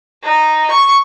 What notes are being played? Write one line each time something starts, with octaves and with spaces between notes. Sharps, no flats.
D#4
C#6